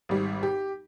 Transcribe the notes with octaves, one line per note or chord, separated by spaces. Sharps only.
G#1 G3
G4